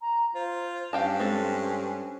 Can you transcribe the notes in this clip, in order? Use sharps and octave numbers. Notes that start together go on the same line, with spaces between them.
A#5
F4 C5
G2 C#4 F5 G5 A5
G#3 C4 A4